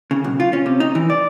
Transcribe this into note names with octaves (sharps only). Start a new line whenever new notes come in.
C#3
B1
F4
C#4
C3
D#4
E3
D5